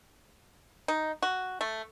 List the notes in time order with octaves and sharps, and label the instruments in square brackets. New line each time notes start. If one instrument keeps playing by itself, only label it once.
[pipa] D#4
F#4
A3